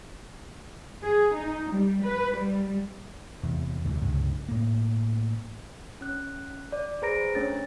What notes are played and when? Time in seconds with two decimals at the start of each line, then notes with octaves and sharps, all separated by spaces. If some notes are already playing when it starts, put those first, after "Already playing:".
1.03 G#4
1.34 D#4
1.69 G3
2.03 B4
2.34 G3
3.43 E2 C3
3.85 D2 G#2 C3 A3
4.01 C#2 G2 C3
4.49 A2 A#3
6.01 C#4 F#6
6.72 D5
7.02 G#4 B4 C5 A#5 A#6 D7
7.35 A3 C#4 D4 C#5 A6